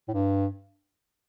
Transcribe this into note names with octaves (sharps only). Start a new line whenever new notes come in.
A2
G2